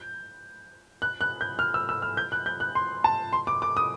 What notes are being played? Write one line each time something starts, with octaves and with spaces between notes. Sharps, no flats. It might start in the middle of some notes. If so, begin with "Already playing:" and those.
Already playing: G6
F#6
F#6
G6
F6
E6
E6
F6
G6
F#6
G6
F#6
C6
A5
C6
D6
D6
D#6